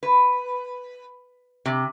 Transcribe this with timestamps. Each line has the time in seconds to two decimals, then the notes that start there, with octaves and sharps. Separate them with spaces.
0.03 B4
1.66 C3